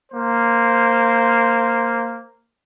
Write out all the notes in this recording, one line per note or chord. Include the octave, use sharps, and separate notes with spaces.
A#3 C5